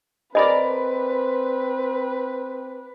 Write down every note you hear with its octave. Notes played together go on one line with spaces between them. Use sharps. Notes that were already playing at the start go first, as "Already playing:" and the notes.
C4 G#4 A#4 B4 D5 D#5 B5